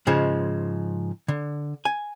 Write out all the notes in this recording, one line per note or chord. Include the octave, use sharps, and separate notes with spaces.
G#2 C#3 F3 G#3
D3
G#5